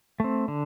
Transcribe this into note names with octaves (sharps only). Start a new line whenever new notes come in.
A3 C4
D3